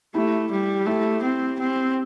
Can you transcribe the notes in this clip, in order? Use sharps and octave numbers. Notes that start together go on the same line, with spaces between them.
A3 E4 G4
G3
A3 E4 G4
C4
C4